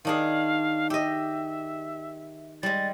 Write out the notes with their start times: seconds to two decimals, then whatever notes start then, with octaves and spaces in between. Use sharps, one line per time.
0.05 D#3 D4 G#4 F5
0.90 G4 D#5 E5
2.63 G3 G#3 A6